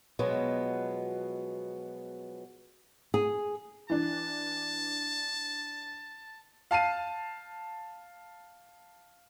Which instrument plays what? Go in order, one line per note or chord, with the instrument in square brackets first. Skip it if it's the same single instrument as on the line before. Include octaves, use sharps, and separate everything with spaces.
[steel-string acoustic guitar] B2 F3 F#3 G#3 B3
[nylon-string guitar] G#4
[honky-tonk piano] E3 D4 [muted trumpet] A5
[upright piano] F5 A5 C7 D#7